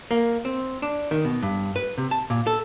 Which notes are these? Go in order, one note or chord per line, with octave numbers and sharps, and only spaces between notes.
A#3
C4
D4
D#3
B2
G2
B4
C3
A5
A#2
A4